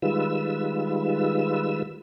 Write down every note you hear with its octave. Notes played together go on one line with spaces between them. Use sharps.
D#3 G3 G#3 F4 B4 E6